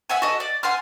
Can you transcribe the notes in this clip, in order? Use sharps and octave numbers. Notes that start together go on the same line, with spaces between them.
E5 F#5 G#5
F#4 A4 D#5
D5
F#5 G#5 C6 F6